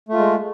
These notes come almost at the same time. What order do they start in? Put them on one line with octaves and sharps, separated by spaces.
A3 F4 G#3